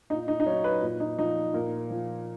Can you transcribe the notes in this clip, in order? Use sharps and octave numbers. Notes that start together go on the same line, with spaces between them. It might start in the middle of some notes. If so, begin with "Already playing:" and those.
A#2 D#4
D#4
D#4
F#3 C#4
B4
A#2
D#4
F3 D#4
A#2 A#4
F3